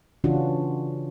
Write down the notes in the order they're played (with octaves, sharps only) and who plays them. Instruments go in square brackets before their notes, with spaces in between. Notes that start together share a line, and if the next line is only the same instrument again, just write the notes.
[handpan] C#3 E3 C#4 D4 F4 F#4